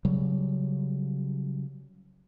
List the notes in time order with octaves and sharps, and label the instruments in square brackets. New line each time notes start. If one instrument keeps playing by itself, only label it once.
[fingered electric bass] C#3 F#3 G3